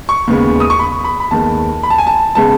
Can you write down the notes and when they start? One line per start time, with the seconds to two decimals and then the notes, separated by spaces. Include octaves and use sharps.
0.09 C#6
0.27 D#2 C#3 G#3 B3
0.60 D#6
0.70 C#6
0.79 B5
1.04 B5
1.20 B5
1.31 D#2 D#3 G#3 B3 A5
1.83 B5
1.90 A5
1.98 G#5
2.07 A5
2.35 C#3 G#3 B3 A5